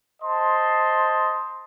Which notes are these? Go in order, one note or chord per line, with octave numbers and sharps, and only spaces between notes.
C5 D#5 A5 C6